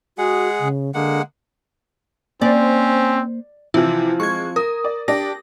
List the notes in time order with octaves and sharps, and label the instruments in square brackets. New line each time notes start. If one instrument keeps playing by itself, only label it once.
[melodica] G#3 G#4 F#5 [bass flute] F#4
[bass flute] C#3
[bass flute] D3 [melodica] G#3 A#3 F#5
[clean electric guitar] A#3 C5 [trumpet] C4 [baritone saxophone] C#4 [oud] D5
[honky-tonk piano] C3 E3 [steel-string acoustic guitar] F3 C4 F4 [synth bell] E4
[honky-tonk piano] G#3 [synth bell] C#6 G#6
[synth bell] A#4 [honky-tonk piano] D#6
[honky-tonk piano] D5
[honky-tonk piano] D4 [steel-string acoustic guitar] G4 [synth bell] A#6